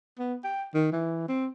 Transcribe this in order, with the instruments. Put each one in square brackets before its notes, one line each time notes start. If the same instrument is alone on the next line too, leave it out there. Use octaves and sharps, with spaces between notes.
[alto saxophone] B3
G5
D#3
E3
C4